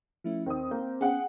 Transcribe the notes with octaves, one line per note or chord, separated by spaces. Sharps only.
F3 A3 C#4 E4
D#2 D#3 C4 D#6
A#3 G6
B3 C#4 G#4 F#5 G5